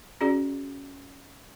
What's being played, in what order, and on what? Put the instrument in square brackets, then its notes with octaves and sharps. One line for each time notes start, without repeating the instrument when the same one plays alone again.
[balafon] C#4 F#4 G#4 D5